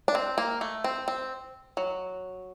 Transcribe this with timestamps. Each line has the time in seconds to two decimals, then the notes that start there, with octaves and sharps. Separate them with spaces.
0.08 D4
0.15 C4
0.38 A#3
0.61 A3
0.84 C4
1.08 C4
1.77 F#3